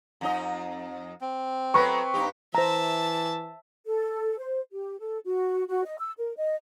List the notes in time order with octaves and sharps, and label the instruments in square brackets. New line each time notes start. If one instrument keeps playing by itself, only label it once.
[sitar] F2 D#4 D#5
[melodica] C4
[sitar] F#3 A3 B3 [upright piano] B4 C#6
[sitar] G2 D#4 G4
[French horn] E3 [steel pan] C5 A#5 [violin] E5 A5
[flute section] A4
C5
G4
A4
F#4
F#4
D#5
E6
A#4
D#5